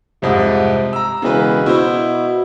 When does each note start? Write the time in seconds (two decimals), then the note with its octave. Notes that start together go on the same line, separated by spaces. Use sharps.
0.22 C2 F2 G#2 C3
0.93 A#5 E6
1.22 E1 C#3 B4
1.66 B2 E4 C5